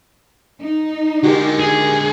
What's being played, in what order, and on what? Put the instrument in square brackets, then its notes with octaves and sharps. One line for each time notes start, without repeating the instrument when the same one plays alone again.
[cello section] D#4
[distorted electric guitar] D3 G#3 [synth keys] F#4 G4 A#4
[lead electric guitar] G#4